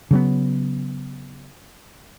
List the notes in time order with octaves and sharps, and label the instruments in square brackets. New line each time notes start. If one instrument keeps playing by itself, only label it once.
[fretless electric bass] C#3 F#3 B3